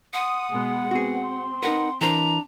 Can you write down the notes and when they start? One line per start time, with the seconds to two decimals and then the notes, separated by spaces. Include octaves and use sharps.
0.13 F#5 C6 D#6
0.50 B2 G#3 B3 G#5
0.91 B3 C4 F#4 G#4
1.22 C6
1.63 D#4 A#4 B4 F#5
2.01 E3 D4 A#4 C5 A#5